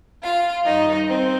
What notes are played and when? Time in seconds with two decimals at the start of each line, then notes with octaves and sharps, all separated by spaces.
0.22 F4 F5
0.65 G2 D#3 D#4 D#5
1.08 C4 C5